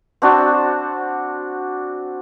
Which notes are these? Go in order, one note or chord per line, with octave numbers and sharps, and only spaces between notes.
C4 D4 F#4